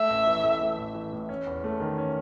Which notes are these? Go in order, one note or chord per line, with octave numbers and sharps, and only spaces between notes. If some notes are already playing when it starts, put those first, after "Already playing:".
Already playing: A3 E5
A1
E3
A2
A3
A1
E3
A2
C#4
E2
A3
D#3
C#4